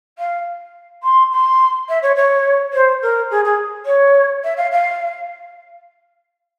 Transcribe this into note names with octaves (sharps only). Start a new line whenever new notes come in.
F5
C6
C6
E5
C#5
C#5
C5
A#4
G#4
G#4
C#5
E5
F5
F5